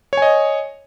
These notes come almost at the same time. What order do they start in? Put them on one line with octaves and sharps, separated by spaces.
C#5 G#5 D#5